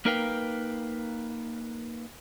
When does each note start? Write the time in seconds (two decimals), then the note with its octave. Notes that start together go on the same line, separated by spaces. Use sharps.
0.05 A#3 D#4 A#4 B4 F5 G5